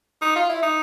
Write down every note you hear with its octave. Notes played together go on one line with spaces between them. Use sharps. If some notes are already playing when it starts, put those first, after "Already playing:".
D#4
F4
E4
D#4